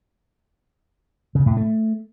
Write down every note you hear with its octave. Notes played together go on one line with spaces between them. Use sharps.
C#3
A2
A3